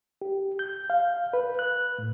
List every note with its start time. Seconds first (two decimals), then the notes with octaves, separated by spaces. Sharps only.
0.22 G4
0.59 G6
0.90 F5
1.33 B4
1.59 F#6
1.98 A2